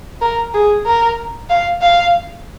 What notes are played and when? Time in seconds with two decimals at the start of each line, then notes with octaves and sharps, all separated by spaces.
0.21 A#4
0.54 G#4
0.86 A#4
1.50 F5
1.82 F5